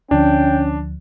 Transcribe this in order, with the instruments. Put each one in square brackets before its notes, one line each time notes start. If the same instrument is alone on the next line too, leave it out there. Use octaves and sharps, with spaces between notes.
[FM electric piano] D2 D3 F3 [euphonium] C#4 [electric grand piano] D4 [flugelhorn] G5